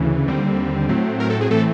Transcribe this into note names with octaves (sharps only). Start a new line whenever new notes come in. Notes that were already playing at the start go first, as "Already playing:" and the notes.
Already playing: D2 C#3 E3
D#2 D3 G3 C4
A2 F#3 A3 C4
A#4
A4
G#4
A2 E3 A3 C4 A4